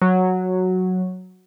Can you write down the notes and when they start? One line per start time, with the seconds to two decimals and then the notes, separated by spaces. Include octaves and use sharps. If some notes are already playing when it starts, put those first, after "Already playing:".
0.02 F#3